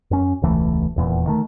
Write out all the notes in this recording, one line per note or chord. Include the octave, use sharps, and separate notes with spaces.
F#2 C#4
E1 C#2 E3 A3
D#1 E2 A#2
D#3 A3